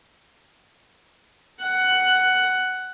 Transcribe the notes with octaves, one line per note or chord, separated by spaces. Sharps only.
F#5